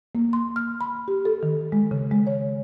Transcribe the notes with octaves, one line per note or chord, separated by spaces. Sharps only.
A#3
C6
F6
B5
G4
A4
D#3
G#3
C#3
G#3
C#5